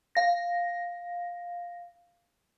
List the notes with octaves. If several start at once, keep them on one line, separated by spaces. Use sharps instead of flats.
F5 A#6